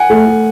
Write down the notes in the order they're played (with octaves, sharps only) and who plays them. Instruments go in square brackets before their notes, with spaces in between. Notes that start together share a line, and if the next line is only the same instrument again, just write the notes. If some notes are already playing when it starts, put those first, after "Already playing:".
Already playing: [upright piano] F#5 G#5
[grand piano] A3
A3